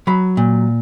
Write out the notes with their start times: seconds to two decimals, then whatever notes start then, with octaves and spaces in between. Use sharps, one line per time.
0.07 F#3 B5
0.37 A#2